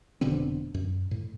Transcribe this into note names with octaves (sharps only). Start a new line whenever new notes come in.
F1 B2 D3 C4
F#2
A2